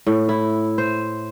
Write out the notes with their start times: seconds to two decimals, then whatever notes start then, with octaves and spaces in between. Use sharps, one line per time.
0.07 A2
0.29 E4
0.78 C5